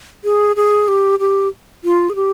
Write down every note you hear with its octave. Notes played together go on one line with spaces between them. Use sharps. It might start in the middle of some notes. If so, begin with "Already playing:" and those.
G#4
G#4
G4
G4
F4
G#4
G4